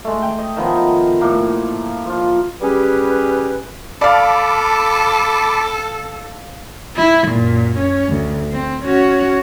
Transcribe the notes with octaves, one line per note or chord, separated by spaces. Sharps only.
G#3 A3
G5
D#5
D#3 F3 B3
A2 A#3
F3 F4
G3 C#4 G4 G#4 B4
A4 D5 F5 A5 B5 D6
E4
F#2 A#2
C#4
D2
C4
C#4 F#4